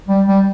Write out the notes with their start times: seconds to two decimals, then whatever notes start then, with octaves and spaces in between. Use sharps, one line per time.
0.08 G3
0.27 G3